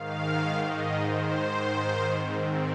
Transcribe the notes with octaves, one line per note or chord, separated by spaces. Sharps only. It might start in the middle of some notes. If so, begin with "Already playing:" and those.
Already playing: G#2 D#3 F5
D#5
C5
G#2 D#3
C4